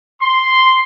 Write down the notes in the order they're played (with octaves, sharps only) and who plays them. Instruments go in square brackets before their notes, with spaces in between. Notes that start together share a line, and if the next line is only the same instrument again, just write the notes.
[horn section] C6